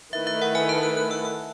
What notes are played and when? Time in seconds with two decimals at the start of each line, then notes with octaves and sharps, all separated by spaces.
0.13 D#3 A3 E4 B4 E5
0.27 E5
0.42 F#5
0.55 G#5
0.69 A5
0.83 F#6
0.97 F#6
1.11 E6
1.25 E6